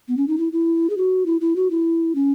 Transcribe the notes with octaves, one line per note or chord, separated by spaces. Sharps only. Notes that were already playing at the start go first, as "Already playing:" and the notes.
B3
C#4
D#4
E4
E4
G#4
F#4
E4
E4
F#4
E4
C#4